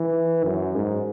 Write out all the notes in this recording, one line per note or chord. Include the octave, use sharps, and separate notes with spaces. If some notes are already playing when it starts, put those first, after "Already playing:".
Already playing: E3
F#2
G#2